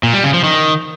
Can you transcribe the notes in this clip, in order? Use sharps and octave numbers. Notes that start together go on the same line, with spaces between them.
A#2
G3
C#3
F3
D#3